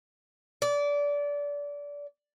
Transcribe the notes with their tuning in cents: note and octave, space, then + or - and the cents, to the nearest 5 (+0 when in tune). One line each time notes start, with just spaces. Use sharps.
D5 -25